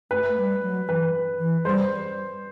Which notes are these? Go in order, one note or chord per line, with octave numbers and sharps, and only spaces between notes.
A3 B4
G3
F#3
E3 B4
E3
G3 C5